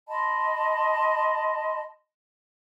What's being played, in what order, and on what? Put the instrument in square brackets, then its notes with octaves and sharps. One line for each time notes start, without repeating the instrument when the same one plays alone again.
[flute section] D#5 A5 B5 C6